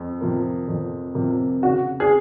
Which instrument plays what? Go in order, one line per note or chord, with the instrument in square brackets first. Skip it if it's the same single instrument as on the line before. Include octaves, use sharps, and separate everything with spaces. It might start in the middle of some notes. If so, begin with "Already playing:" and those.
Already playing: [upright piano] F2
C3 F3 A#3
F2
C3 F3 A#3
[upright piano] C#3 [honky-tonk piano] F#4
[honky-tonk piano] G#4